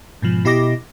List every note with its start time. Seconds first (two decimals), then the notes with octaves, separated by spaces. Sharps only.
0.22 G#2 B2 F3
0.45 B2 E4 G4 D#5 D6 A#6